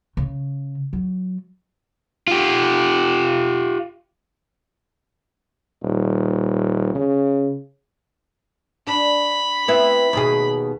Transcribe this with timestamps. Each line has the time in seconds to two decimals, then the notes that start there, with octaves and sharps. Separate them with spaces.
0.17 C#3
0.93 F#3
2.28 F4 G4
5.83 D#1
6.95 C#3
8.87 D4 B5
9.68 B3 C4 E4
10.13 D#2 B2 G#4